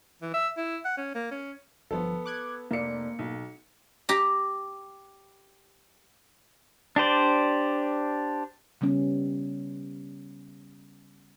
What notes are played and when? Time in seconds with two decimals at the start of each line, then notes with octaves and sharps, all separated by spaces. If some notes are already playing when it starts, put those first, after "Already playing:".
0.22 E3
0.34 E5
0.57 E4
0.85 F#5
0.98 C#4
1.15 A#3
1.31 C#4
1.91 G1 F3 B3 A4
2.25 D6 F#6 G#6
2.71 F1 A#3 D5 C#7
3.19 B1
4.09 G4 A#5
6.96 D4 G4 C5 D5
8.81 C#3 G3 B3 C#4